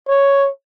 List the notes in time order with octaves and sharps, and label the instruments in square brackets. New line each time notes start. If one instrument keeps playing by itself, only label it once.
[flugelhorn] C#5